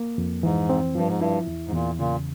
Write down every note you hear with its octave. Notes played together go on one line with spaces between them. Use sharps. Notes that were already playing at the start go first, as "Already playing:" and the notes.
Already playing: A#3
F2
G#2 E3
C4
G2 F3
G#2
G2 E4
E2
G#2
E2 A#2
A#2 C#3